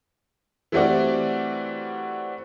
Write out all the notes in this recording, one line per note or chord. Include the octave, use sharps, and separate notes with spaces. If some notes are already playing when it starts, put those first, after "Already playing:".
E3 G3 A3 C4 F#4 D5